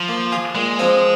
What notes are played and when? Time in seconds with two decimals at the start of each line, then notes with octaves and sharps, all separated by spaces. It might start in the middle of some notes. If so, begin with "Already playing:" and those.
Already playing: F3
0.09 A#3
0.32 F4 G#4
0.55 A#2 G#3
0.79 F3 C4 F4 C5